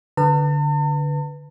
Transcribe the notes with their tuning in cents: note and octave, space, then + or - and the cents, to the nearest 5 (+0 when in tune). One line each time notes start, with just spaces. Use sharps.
D3 -10 B4 +0 A5 +45